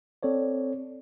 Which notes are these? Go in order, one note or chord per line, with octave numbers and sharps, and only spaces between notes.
C4 A4 C#5 D5